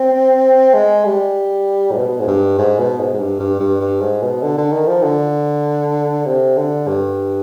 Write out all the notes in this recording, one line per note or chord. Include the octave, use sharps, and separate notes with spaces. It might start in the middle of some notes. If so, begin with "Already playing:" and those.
Already playing: C4
G#3
G3
G#2
B2
G#2
G2
G#2
B2
G#2
G#2
G2
G2
G2
G2
G#2
B2
D3
D3
D#3
F3
D3
C3
D3
G2